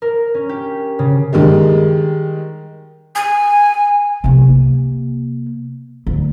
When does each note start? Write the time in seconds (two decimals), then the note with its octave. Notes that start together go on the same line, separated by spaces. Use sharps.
0.02 A#4
0.34 C#4
0.49 G4
0.99 C#3
1.33 D#3 G3 G#3
3.15 G#5
4.24 C3 A#3
6.07 D2